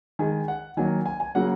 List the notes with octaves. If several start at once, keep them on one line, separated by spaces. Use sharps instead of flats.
D#3 G#3 G#5
F#5
D#3 F#3 A#3 G#5
G#5
G#5
C#3 F#3 A#3 F#5